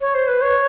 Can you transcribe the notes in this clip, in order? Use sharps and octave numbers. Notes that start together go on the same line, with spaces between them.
C#5
C5
B4
C#5